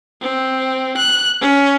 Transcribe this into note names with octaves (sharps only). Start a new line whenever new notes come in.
C4
F#6
C#4